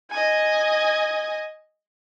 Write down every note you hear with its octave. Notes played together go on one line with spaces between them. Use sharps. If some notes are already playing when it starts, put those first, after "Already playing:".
D#5 G#5